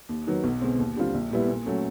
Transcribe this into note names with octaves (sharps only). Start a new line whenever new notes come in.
D#2
D#3 F#3 B3
B1
B2 G#3 C4
D#2
D3 G3 C4 F4
A#1
A#2 G3 B3 E4
A#2
F#3 A3 C#4